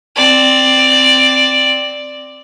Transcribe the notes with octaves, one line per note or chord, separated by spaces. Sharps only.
C4 D5